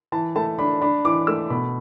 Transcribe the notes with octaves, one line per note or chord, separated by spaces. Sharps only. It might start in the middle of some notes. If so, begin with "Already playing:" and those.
E3 A5
A3 A5
D4 B5
D4 B5
E3 D6
A3 E6
B2 B5